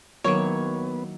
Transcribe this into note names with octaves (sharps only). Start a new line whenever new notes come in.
D#3 F#3 A#3 B3 E4 C#5